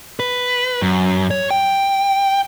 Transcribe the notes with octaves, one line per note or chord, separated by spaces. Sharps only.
B4
F#2
C#5
G5